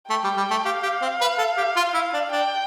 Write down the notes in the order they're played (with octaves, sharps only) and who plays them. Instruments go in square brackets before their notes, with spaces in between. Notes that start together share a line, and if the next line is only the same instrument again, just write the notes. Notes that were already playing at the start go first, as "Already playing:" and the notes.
[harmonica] A3 [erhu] G5
[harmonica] G3
G3
A3
[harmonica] G4 [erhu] F5
[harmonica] G4
C4
B4
A4
G4
F4
E4
D4
[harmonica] D4 [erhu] G5